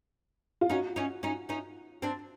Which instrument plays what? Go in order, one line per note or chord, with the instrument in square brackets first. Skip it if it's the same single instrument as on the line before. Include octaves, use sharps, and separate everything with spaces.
[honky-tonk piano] F4
[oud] C#4 D#4 [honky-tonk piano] F#4
[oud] C#4 D#4
C#4 D#4
C#4 D#4
C4 D4